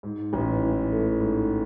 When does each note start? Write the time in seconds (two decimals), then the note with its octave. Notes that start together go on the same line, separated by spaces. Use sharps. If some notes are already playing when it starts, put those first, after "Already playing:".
0.03 G#2
0.33 A1
0.62 E3
0.92 A3
1.20 G#2